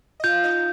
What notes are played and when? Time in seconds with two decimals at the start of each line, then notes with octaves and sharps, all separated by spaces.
0.20 D#5
0.23 F4 F5 G6
0.44 D#4 D#5